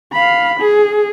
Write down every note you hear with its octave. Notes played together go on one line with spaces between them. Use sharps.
F5 B5
G#4